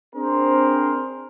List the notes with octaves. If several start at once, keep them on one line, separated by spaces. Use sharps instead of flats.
C4 D4 G#4 A#4 C5